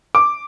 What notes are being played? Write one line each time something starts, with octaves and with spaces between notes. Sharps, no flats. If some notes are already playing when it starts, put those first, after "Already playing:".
D6